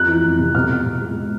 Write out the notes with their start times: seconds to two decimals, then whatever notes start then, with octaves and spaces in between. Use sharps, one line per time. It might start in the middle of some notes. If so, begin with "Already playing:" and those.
Already playing: F2 F#6
0.08 E3
0.24 F2
0.39 C3
0.55 B2 F6
0.70 C4
0.86 B2
1.02 G#3